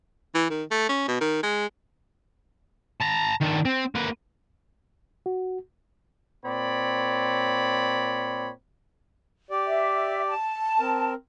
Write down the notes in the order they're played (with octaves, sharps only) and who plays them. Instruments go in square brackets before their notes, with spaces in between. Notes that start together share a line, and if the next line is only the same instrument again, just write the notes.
[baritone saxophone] E3
D#3
A3
C#4
B2
D#3
G#3
[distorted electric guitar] A5 A#5
D#3 D4
C4
A#3 B4
[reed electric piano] F#4
[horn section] A#2 C4 C#5 D5 B5
[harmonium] G4 D5
[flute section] E5
A5
[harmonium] C4 A#4